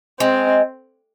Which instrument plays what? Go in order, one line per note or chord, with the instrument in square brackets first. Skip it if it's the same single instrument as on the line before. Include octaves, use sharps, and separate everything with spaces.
[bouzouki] G#3 [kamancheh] C4